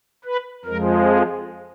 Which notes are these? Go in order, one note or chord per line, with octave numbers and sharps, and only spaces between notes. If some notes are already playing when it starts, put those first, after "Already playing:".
B4
F2 F3 G#3 A#4
G#4